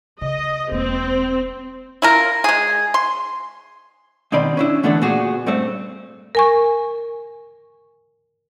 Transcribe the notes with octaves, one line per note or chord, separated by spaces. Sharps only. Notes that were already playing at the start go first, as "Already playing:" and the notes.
C#3 D#5
E1 A#3 C4
E4 F4 A#4
G#3 G#4
C6
B2 D#3 C4 D5 B5
C#4 D4 E4
D3 E3 A3 B3 D4 A4
A#2 A3 B3 F#4 G#4
G2 A3 C4
A#4 G#5 C#6